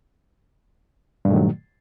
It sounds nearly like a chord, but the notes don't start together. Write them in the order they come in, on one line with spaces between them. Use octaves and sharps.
G2 A#2 A3 D#3 F#3